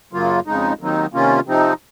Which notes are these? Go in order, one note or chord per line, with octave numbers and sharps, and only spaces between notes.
F#2 C#3 F#3 A#3 F4
F2 C#3 G#3 D#4
D#2 D#3 F#3 C4 D#4
C3 D#3 A#3 C#4 F4
C3 F3 C4 D#4